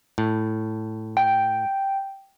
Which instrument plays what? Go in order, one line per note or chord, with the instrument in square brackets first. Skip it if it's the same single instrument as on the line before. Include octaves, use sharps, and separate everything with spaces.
[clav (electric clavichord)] A2
[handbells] G5